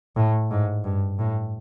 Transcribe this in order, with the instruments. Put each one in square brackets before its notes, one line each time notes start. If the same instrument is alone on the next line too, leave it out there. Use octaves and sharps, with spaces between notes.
[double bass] A2
G#2
G2
A2